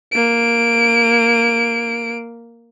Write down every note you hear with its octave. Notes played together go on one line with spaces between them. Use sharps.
A#3 D7